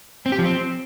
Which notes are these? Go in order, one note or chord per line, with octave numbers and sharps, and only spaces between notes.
C4
G4
F3
C4